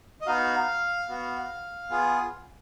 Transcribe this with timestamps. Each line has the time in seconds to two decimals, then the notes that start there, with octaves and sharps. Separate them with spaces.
0.21 D#5
0.26 B3 D#4 F#4 F5
1.08 B3 F#4
1.90 B3 F4 G#4